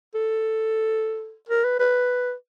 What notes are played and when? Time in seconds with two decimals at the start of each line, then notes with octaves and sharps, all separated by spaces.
0.14 A4
1.49 A#4
1.64 B4
1.79 B4